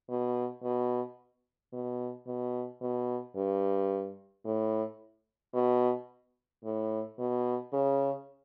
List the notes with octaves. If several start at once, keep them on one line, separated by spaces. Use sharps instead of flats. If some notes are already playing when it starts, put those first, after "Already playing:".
B2
B2
B2
B2
B2
G2
A2
B2
A2
B2
C#3